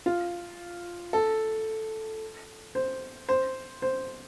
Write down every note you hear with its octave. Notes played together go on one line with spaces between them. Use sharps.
F4
A4
C5
C5
C5